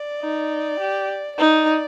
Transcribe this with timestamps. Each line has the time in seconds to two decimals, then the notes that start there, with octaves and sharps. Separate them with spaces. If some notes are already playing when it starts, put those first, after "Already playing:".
Already playing: D5
0.21 D#4
0.79 G4
1.38 D#4 D5